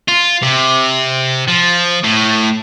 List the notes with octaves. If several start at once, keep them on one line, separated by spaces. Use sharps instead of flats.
F4
C3
F3
A2